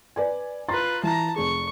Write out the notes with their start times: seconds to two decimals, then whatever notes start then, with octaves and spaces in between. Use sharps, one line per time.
0.16 B4 D5 G#5
0.69 F4 B4 A#5 C6 A6
1.03 E3 A5 A#5
1.36 F1 G#4 C#6